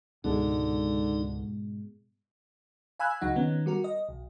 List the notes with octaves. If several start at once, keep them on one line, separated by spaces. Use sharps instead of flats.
C#2 G#2 B2 D3 G#3 D#4
F5 G#5 B5 E6 F#6 G#6
C#2 F#3 D#4 F#5
D#3 B3 C#4 D#4
G3 F#4 A#4
D#5
B1